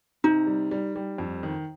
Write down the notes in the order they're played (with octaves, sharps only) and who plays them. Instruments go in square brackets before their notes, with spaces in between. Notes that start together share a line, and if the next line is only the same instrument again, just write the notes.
[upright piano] C3 [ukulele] D#4
[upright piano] G3
G3
G3
F2
D#3